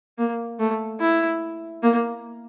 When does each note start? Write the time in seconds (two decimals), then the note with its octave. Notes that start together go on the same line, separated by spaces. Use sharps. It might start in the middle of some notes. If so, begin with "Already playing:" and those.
0.18 A#3
0.59 A3
1.00 E4
1.83 A#3